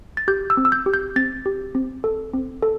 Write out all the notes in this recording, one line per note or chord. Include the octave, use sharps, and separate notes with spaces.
A6
G4 G6
E6
C4
E6
G6
G4
G6
C4 A6
G4
C4
A4
C4
A4